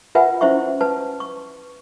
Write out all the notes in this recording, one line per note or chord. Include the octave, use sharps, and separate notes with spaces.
F4 A#4 B4 E5 F#5 G#5
C#4 E4 C5 E5 C#6
B4 A5
C#6